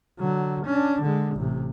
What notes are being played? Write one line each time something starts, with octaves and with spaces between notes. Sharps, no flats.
D3 F#3
C#4 D4
D3 G#3
A1 C3